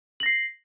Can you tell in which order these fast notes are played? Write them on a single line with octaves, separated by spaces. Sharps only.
F#7 A#6 C7